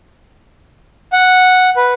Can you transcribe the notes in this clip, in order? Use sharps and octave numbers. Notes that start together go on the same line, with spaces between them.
F#5
B4